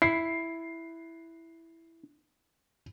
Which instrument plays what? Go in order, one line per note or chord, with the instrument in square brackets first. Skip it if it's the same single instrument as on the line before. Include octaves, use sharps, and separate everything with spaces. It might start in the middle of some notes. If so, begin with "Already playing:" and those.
[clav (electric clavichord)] E4 [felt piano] C7